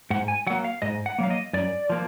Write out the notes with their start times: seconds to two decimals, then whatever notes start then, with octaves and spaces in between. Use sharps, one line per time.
0.10 G#2 F#5
0.28 G#5
0.47 F#3 F#5
0.50 A#3
0.64 F5
0.82 G#2 D#5
1.06 F#5
1.19 F#3 A#3 F5
1.30 D#5
1.53 F#2 D5
1.90 F3 A#3